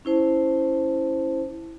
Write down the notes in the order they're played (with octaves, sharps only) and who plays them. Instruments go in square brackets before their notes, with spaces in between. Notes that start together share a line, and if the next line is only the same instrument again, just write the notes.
[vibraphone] C#4 E4 C5 A5